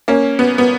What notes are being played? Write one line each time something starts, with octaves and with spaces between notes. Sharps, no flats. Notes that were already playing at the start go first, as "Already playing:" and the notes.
A#3 C#4
B3
B3